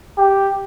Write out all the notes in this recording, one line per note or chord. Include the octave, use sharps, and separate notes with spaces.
G4